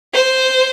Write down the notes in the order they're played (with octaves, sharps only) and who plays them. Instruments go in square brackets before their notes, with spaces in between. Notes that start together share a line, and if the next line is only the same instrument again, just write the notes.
[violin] C5